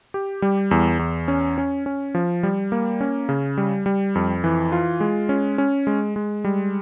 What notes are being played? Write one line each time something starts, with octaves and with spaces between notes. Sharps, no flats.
G4
G3
E2
E2
C#4
C#4
C#4
F3
G3
A#3
C#4
C#3
G3
G3
F2
E3
F4
G#3
C#4
C#4
G#3
G#3
G3